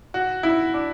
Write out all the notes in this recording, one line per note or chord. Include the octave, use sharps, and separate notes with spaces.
F#4
E4
D4